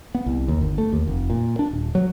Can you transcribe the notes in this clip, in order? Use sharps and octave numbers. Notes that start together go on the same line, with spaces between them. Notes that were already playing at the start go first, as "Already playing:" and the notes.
B3
C2
D#2
G1
A3
D#2
F1
A#2
D4
D#1
F#3